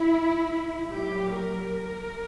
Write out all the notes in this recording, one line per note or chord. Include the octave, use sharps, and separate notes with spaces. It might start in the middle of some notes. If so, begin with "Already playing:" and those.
Already playing: E4
A#2 F#3 G4
A#4